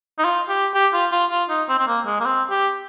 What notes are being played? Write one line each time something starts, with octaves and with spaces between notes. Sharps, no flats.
D#4
F4
G4
G4
F4
F4
F4
D#4
C4
C4
A#3
G#3
A#3
C4
G4